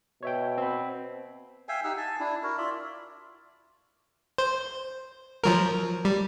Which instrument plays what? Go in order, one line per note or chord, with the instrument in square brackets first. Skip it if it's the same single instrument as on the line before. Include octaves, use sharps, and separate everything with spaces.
[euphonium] B2 [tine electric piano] C#5 E5 G5
[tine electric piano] C4 B5
[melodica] E5 F5 G5 G#5
D#4 G4 F#5 E6
G#5 A5
D4 E4
E4 F#4 A#4
F4 D5 E5
[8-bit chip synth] C5
F3 F#3 A#4
G3